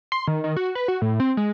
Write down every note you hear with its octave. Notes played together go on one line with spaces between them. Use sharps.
C6
D#3
D#3
F#4
B4
F#4
A2
C4
G#3